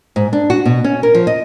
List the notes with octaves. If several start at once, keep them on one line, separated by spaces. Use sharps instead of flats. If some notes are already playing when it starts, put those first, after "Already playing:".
G#2
D4
F#4
B2
C#4
A#4
F3
D#5